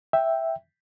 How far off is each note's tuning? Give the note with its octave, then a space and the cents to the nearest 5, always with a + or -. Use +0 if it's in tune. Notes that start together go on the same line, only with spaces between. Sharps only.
E5 +0 G5 +0